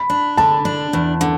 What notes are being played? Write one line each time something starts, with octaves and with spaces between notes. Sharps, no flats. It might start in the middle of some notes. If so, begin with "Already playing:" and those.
Already playing: B5
D4
D3 A5
D4
E2
D3